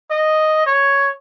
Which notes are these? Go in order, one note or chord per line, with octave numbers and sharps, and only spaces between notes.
D#5
C#5